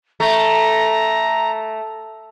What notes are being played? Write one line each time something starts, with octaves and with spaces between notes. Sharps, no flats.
A3 A#5